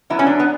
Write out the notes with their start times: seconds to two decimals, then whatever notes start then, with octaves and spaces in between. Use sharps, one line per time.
0.10 F#3 B3 E4
0.19 C#4
0.26 D4
0.40 B3